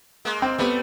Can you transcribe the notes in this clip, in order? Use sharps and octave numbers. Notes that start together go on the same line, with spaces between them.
G#3 A#3
C4
G3 A3 B3